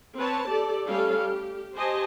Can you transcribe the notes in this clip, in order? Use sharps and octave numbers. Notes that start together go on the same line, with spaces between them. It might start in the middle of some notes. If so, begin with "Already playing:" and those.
C4 B4 C#5 A5
G4 A4 D5
G3 A3 C#4 G4 A4 F5
G4
G4 C5 D#5 G#5 A5